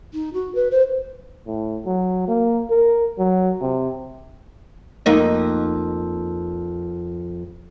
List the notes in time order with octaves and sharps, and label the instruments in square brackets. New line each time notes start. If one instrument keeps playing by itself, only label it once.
[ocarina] D#4
F#4
B4
C5
[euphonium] A2
F#3
A#3
A#4
F#3
C3
[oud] F2 A#3 D#4